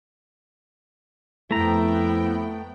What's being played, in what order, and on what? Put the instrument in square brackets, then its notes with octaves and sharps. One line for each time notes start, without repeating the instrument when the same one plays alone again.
[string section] F2 B3 G5 [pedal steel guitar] A3 A#5 [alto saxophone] E4